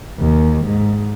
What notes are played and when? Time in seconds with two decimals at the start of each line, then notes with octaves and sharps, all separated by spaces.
0.19 D#2
0.65 G#2